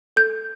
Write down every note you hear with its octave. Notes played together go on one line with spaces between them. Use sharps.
A4 G6